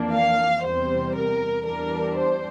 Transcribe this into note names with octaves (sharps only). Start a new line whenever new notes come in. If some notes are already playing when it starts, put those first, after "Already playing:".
Already playing: F2 E3 A#3 D4
F5
E2 C3 G3 C5
A#4
E2 E3 G3 D4 A#4
C5